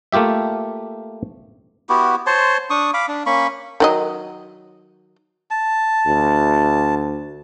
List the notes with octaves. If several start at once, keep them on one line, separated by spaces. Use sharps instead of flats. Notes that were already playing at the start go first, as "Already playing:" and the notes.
A3 A#3 F4 G4 E5
B3 E4 F#4 G4
C5 C#5 A5 C6
D4 C#6 D#6
F5 B5 D6
D4
A#3 C#4 B5 C#6
D#3 F#3 D#5
A5
D2